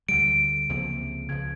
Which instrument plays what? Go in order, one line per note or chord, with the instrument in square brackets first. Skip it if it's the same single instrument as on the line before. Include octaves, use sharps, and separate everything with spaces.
[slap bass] D2 D3 G3 [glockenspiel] D7
[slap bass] C#2 C3 F3 A#3
[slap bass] C#2 C#3 F3 [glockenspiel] G#6